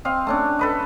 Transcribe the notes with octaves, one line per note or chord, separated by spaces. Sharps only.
C4 D#5 F5
A3 C#4 D4
A4 B4 D#5